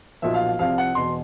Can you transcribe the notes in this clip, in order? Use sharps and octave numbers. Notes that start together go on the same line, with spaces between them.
B1 A#2 F3 E5
F5
F5
C2 C3 F3 F5
F#5
E1 E2 B2 C6